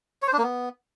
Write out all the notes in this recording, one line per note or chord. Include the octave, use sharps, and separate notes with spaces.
C#5
C5
D4
A#3
B3